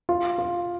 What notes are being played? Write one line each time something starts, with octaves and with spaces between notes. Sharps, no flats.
F4
F4